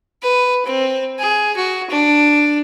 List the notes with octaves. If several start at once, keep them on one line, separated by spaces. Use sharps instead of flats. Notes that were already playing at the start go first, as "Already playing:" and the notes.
B4
C4
G#4
F#4
D4